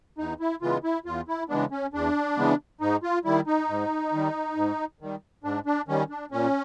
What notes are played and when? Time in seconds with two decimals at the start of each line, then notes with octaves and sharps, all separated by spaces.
0.18 E2 D#4
0.40 E4
0.62 C#3 E3 G#3 B3 F4
0.84 E4
1.06 E2 F4
1.28 E4
1.49 C#3 E3 G#3 B3 D4
1.71 C#4
1.94 E2 D4
2.38 C#3 E3 G#3 B3
2.81 G#2 D#4
3.03 F4
3.25 D#3 G3 E4
3.47 D#4
3.69 G#2
4.13 D#3 G3
4.56 G#2
5.00 D#3 G3
5.44 G#2 D4
5.66 D4
5.88 D#3 G3 C#4
6.10 D4
6.32 A#2 C#4